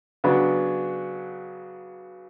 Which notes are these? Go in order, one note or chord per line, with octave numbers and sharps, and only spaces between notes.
C#3 F#3 B3 D4